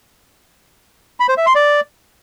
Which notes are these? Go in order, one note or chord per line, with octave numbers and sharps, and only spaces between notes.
B5
C5
E5
C6
D5